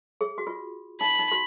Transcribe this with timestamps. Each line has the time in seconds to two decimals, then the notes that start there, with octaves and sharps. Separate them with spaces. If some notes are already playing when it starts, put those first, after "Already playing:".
0.21 G#4
0.38 F#4
0.47 F4
1.01 D#4 B5
1.19 D#4
1.32 F#4